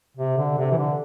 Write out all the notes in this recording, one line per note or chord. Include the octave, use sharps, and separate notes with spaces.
C3
D3
C3
E3
D3